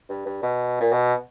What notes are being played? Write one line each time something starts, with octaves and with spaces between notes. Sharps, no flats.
G2
G2
B2
A#2
B2